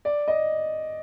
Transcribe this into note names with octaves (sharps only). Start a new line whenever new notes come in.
D5
D#5